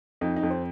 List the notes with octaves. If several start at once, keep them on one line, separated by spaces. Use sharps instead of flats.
F2 D#4
D#4
F2
C4